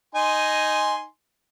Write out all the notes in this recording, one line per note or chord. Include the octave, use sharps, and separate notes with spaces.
D#4 G#5 C6